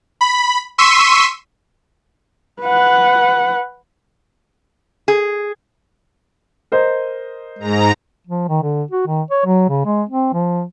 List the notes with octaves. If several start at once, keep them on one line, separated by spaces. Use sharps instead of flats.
B5
C6 C#6 E6 B6 D#7
B4 F#5
G#4
A#4 C5 D#5
G#2 G#3 A#5
F3
D#3
D3
F#4
D#3
C#5
F#3
C#3
G#3
C4
F3